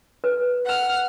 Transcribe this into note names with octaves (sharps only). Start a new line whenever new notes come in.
B4
F#5 F6